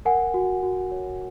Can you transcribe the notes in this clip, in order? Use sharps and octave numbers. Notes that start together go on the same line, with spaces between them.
A#4 F#5 G#5
F#4
F#4
C#5